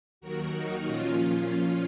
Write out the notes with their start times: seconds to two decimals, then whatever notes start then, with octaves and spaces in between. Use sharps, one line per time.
0.21 D#2 D#3 F#3 F#4 A#4
0.54 D#4 F#4
0.86 A#2 F3 C#4 F4